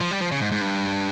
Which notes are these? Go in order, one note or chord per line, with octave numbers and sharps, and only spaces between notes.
F3
G3
F3
C#3
G#2
G#2
G2